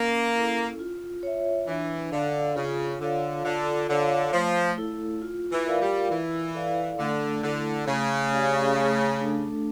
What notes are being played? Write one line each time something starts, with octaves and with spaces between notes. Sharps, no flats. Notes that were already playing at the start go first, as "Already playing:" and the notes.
Already playing: A#3 C#4
E4 A4
F4
C#5 E5
E3 D4
D3 A4 D5 F5
C#3 F4
D3 C#5 F5
D3 F4
D3 C#5 F5
F3 A3
E4 A4
F4
E3
A#4 D5 F5
G3
E3 E4
A4 D5 F5
D3 A3
D3 E4 A4
C#3 A3
C#4 G4 D5 F5
A3
D4 A4